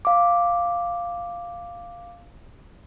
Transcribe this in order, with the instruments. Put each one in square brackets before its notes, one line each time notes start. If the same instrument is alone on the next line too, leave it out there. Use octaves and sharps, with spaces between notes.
[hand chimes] F5 D6